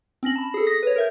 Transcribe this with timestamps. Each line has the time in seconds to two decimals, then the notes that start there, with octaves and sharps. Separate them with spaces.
0.23 C4 C#4 A#6 F#7
0.36 A5 B5
0.54 G#4 A4
0.67 D#6 A#6 B6
0.83 B4 C#5
0.96 A#4 E5 G6